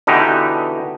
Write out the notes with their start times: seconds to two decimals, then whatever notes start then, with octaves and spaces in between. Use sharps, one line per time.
0.07 B2 D3 E3 D#4 G4